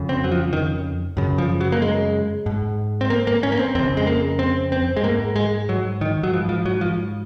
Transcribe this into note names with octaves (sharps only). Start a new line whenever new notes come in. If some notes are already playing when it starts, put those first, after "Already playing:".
Already playing: F2 C#3
C4
F#3
F3
D#3
F#2 C#3
F3
F#3
A#3
G#3
G#2
C4
A#3
A#3
C#4
A#3
C4
F2 C#3 C4
G#3
A#3
C4
C4
G#3
G#2 A#3
G#3
F#3
D#3
F#3
G#2 F3
F3
F#3
F3